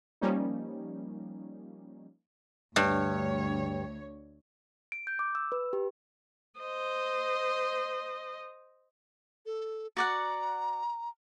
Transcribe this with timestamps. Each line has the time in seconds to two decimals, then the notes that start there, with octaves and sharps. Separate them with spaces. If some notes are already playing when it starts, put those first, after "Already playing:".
0.21 F3 G3 A#3 C#4 D#4
2.76 D2 G2 D3 C#5
4.92 D7
5.07 G6
5.19 D6
5.35 E6
5.52 B4
5.73 G4
6.60 C5 D#5
9.46 A4
9.97 F#4 D5 F#5 A#5